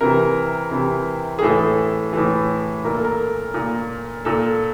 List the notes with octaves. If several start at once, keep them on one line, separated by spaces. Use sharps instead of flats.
C3 E3 A#4
C3 E3
G#4
A2 E3 A4
A2 E3
A#2 A#4
A4
A#4
A#2
A#2 A4